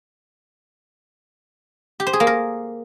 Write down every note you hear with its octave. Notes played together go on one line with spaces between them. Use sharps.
G4
C5
G#4
A#3
A#4